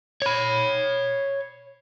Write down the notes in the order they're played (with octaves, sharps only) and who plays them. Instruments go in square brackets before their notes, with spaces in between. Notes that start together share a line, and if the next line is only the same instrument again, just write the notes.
[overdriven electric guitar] C#5 B5